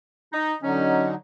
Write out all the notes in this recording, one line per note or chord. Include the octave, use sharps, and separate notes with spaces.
D#4
D3 F#3 C#4 D#4